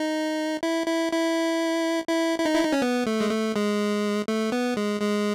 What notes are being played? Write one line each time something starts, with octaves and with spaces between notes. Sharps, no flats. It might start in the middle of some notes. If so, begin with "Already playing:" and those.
Already playing: D#4
E4
E4
E4
E4
E4
D#4
E4
D#4
C#4
B3
A3
G#3
A3
G#3
A3
B3
G#3
G#3